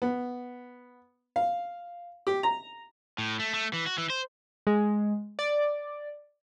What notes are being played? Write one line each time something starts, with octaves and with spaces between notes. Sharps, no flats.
B3
F5
G4
A#5
A2
A3
A3
E3
F#4
E3
C5
G#3
D5